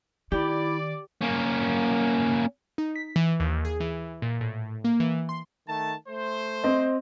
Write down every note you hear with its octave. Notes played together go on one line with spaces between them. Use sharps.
D#3 E4 G4 D5
A#3 C#4
D#4
B6
E3
D#2
G#4
E3
A#2
A2
A#3
E3
C6
D#3 A3 A5
A3 C5
C4 D#5